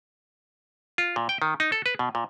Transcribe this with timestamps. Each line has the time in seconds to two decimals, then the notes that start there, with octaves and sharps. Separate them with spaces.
0.98 F4
1.16 A#2
1.29 G5
1.42 D#3
1.60 D#4
1.72 A4
1.86 B4
1.99 B2
2.15 A#2